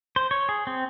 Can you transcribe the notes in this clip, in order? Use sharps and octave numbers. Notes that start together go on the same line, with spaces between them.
C5
C#5
G#4
C4